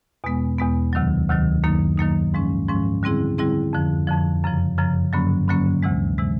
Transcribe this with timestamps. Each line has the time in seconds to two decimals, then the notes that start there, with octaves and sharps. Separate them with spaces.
0.24 E2 B2 G#3 B3
0.58 E2 B2 G#3 B3
0.93 D2 C3 D#3 F#3
1.29 D2 C3 D#3 F#3
1.64 F#2 D#3 F#3 A#3 D#4
1.98 F#2 D#3 F#3 A#3 D#4
2.34 G#2 F3 G#3 C#4
2.68 G#2 F3 G#3 C#4
3.03 D3 G3 C4 E4 G#4
3.38 D3 G3 C4 E4 G#4
3.73 F2 D3 F3
4.07 F2 D3 F3
4.43 F#2 C#3 F3
4.78 F#2 C#3 F3
5.13 G2 D3 F#3 A#3 C#4
5.48 G2 D3 F#3 A#3 C#4
5.83 D2 C3 E3 G#3
6.18 C3 E3 G#3